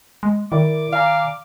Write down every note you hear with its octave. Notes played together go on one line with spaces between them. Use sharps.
G#3
D#3 E4 A#4 D5 D6
D5 F5 G#5 A#5